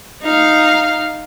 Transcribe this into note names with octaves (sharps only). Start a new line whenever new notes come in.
D#4 F5